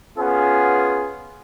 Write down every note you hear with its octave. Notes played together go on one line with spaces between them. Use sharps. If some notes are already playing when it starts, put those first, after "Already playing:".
B3 C#4 F4 G#4